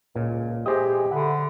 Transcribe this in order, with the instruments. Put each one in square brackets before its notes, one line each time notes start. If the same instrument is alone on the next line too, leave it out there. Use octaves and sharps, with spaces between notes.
[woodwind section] C#2 [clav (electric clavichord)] A#2
[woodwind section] E3 G#3 G4 [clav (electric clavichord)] G#4 C5 D#5
[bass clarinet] D3 [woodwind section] E5 B5 [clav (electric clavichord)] F#5